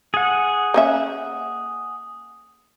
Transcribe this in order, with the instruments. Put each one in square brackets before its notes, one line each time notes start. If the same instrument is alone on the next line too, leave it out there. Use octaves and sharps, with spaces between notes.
[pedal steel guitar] G#4 F#5
[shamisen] A#3 C#4 E5